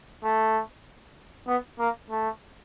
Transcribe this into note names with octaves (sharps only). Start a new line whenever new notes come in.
A3
B3
A#3
A3